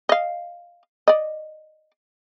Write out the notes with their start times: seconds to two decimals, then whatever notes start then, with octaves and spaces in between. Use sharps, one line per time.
0.09 D#5 F5
1.08 D5 D#5